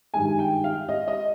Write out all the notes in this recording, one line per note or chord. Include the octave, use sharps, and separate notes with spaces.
G2 D#3 G#3 G#5
G5
F5
D#5
D#5